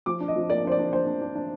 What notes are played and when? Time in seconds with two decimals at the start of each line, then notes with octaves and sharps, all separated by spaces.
0.06 F3 D6
0.21 D4
0.28 D#5
0.36 F3
0.50 A#3 D5
0.65 D4 C5
0.72 D5
0.79 D4
0.93 D4 C5
1.07 D4
1.22 D4
1.36 D4